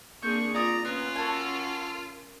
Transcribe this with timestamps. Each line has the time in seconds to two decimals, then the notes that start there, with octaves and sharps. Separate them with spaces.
0.22 A#3 C4 D4 G#4 C#6 G6
0.54 F4 D5 A#5 D#6
0.85 B3 C#4 F4
1.16 F#4 A4 A#4 G#5